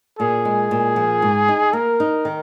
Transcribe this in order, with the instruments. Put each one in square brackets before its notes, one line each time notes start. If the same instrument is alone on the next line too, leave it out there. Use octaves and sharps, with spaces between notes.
[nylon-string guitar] A#2 [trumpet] G#4
[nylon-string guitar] G#3
A#2
F3
G#2
D#4
[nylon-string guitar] A#3 [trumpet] A#4
[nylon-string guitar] D#4
D#3